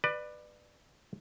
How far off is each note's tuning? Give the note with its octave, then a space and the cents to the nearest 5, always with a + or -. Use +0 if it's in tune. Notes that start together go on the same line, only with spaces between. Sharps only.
B4 +0 D5 +25